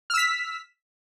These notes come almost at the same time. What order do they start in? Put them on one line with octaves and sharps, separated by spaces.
F6 E6 B6